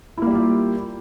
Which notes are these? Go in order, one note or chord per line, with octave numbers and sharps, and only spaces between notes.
G3 A#3 E4 F4 G4